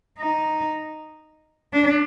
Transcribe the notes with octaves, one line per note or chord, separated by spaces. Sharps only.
D#4
D4